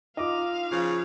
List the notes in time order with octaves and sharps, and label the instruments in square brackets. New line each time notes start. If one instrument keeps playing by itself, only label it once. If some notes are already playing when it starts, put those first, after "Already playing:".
[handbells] D#4 F4 [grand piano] D#5 D6 [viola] F5
[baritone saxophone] C#3 [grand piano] F3